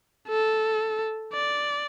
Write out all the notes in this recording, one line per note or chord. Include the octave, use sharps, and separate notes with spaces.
A4
D5